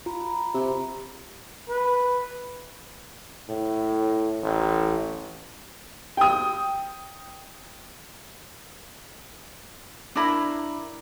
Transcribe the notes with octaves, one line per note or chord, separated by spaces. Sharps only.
F4 A#5 B5
C3
B4
A2
A1
G5 D#6
D4 E4 A#4 B5